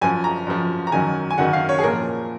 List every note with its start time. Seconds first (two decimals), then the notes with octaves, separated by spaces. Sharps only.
0.01 F#2 F3 G#5
0.24 A#5
0.47 F#2 F3
0.87 A#5
0.92 F#2 D#3 F#3 G#5
1.31 G#5
1.38 F#2 D#3 F#3 F#5
1.53 F5
1.69 C#5
1.79 G#4
1.84 A#2 F3 A#4